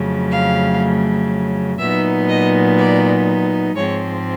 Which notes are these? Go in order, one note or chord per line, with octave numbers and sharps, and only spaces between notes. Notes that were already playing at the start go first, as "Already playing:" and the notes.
Already playing: F2 C#3 F#3 A3
F5
A#2 F#3 B3 D#4 E5
D#5
D5
G#2 F3 G#3 C4 C#5